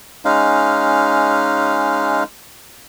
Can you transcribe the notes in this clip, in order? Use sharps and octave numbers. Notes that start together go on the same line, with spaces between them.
G#3 C#4 D#4 F5